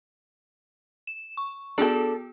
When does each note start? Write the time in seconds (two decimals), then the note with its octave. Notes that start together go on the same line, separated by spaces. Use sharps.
1.07 E7
1.37 C#6
1.78 B3 D4 F#4 G#4 A4